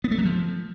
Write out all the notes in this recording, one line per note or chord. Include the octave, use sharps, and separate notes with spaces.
B3
A3
F#3
F3